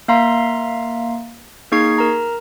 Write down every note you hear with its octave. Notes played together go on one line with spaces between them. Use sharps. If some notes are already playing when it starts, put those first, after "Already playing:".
A#3 E5 F5 A#5 C6
A#3 D#4 G#4 C#6 G#6 C7
A#4 A#5